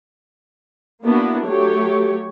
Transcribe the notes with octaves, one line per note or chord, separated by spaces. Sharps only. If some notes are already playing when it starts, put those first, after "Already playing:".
A#3 B3 D4 E4 F#4
F#3 A3 G4 C#5